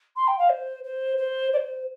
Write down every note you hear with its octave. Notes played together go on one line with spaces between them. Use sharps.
C6
G5
F5
C5
C5
C5
D5
C5